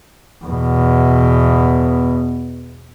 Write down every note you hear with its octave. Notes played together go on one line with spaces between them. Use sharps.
E2 B2